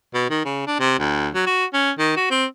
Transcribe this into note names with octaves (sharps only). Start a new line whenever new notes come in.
B2
D#3
C#3
D4
C3
D2
F#3
F#4
C#4
D#3
F#4
C4